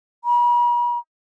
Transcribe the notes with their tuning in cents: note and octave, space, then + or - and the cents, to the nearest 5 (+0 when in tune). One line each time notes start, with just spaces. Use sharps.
B5 -45